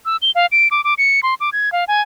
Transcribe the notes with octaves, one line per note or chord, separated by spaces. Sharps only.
E6
G7
F5
D7
D6
D6
C#7
C6
D6
G#6
F5
G#5